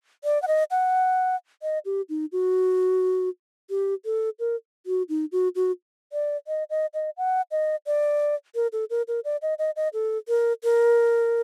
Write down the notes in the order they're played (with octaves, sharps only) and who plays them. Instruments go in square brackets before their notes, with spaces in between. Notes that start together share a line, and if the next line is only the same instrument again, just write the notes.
[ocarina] D5
F#5
D#5
F#5
D#5
G4
D#4
F#4
G4
A4
A#4
F#4
D#4
F#4
F#4
D5
D#5
D#5
D#5
F#5
D#5
D5
A#4
A4
A#4
A#4
D5
D#5
D#5
D#5
A4
A#4
A#4